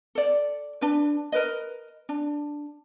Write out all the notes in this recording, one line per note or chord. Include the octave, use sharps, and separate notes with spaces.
A4 D5
D4 B4
A#4 B4 D#5
D4